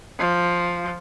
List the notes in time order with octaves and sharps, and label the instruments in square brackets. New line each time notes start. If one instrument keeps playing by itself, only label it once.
[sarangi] F3